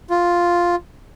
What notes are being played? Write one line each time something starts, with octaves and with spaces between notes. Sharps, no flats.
F4